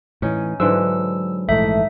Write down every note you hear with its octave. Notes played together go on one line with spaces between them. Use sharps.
A2 E3 C#4 D#4
G#2 D3 E3 F#3 E6
A#1 G#2 E3 A3 D#4 E5